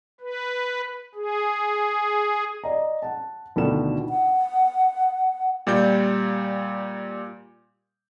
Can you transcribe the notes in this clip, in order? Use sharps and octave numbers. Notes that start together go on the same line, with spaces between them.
B4
G#4
D5 D#5 A#5
F#5 A5
D2 B2 D#3 D4 F4 E7
F#5
A#2 G3 D5 G6